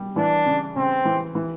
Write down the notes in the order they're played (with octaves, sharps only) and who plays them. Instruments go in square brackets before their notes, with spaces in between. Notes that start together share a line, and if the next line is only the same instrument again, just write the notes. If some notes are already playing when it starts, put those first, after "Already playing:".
Already playing: [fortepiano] G3
[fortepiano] E3 [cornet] D4
[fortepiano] C#3
[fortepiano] C#3 [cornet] C4
[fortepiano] E3
E3